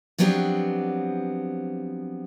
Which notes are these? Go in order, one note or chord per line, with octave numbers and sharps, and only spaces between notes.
F3 F#3 B3 C4 D4 G4